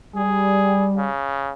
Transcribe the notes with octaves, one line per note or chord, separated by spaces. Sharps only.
G3 G#4
C#3